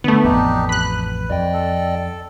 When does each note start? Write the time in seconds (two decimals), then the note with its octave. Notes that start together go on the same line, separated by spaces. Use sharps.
0.04 D3 A3 B3
0.25 A1 F2 D4 D#4 G4
0.69 B4 B5 F#6
1.30 F2 D5 D#5 G5
1.53 A4